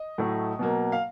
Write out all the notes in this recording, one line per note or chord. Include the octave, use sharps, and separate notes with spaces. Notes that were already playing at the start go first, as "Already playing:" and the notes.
Already playing: D#5
A2 F#3 A3
B2 F#3 A#3
F5